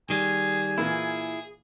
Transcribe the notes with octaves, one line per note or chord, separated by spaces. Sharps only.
D#3 G3 G#4 G#5
A#2 E3 A#3 E4 G#4